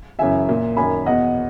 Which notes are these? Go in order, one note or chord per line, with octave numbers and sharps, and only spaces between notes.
F#2 C#3 E3 E5 G#5
A#2
F#2 D#3 G#5 B5
E2 B2 D#5 F#5